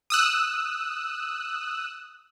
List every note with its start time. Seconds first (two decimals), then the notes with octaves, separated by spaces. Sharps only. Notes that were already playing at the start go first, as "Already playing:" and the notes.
0.10 D#6 E6 F#6